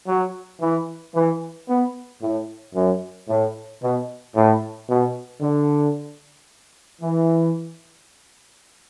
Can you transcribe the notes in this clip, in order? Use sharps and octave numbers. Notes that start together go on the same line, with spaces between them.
F#3
E3
E3
B3
A2
F#2
A2
B2
A2
B2
D3
E3